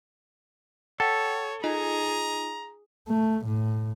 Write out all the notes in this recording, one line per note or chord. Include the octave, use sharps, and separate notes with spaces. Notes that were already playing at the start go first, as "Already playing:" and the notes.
A4 C#5 F#5 G5
D#4 F4 G#4 D#5 A#5
A3
A2